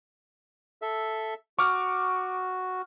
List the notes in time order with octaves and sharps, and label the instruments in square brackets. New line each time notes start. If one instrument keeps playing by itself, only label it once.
[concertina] A4 E5
[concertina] F#4 [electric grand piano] C#6 D6 F6